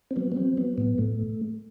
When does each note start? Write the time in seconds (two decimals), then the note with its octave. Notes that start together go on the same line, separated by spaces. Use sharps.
0.11 C4
0.16 F#3 B3
0.32 B3
0.36 F#3 C4
0.57 F#3 B3
0.78 A2 B3
0.98 A2 A3